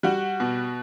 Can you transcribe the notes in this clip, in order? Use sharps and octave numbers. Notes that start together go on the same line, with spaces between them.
G3 F#4
B2